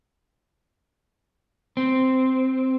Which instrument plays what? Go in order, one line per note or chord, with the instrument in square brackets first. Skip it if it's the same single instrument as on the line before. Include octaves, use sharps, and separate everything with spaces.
[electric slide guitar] C4